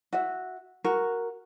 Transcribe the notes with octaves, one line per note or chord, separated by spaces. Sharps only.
F#4 E5
F#4 A#4